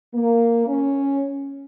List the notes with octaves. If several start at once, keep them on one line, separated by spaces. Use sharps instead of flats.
A#3
C#4